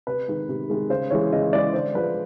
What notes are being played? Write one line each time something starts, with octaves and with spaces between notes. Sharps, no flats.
C3 B4
D#3 G#3
C3
D#3 G#3
C#3 C5
E3 G#3 C#5
C#3 D#5
E3 G#3 D5
D3 C5
F3 G#3 B4